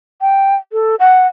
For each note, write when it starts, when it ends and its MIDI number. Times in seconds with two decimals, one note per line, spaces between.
0.21 0.56 79
0.73 0.96 69
1.00 1.27 78